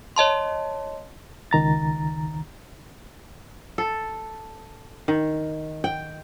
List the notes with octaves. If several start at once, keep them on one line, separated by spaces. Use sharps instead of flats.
C#5 D#5 A5 C6
C#2 D#3 A#5 A6
A4
D#3
G5